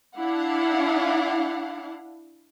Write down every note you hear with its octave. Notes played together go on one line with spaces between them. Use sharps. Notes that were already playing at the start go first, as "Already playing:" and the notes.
D4 E4 F5 F#5